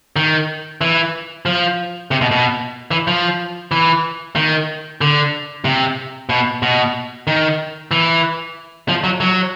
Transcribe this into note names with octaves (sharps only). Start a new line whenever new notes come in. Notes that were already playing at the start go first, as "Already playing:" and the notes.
D#3
E3
F3
C3
B2
B2
E3
F3
E3
D#3
D3
C3
B2
B2
D#3
E3
F3
F#3
F#3